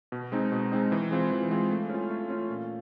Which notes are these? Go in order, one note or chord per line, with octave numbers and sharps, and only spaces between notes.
B2
G#3 C4 D#4
B2
G#3 C4 D#4
E3
G#3 C4 F4
E3
G#3 C4 F4
A3
C#4 F4
A3
C#4 F4
A#2